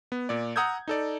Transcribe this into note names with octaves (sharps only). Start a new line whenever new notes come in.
B3
A#2 D5
F#5 A#5 D#6 E6 G6 G#6
D#4 A4 D5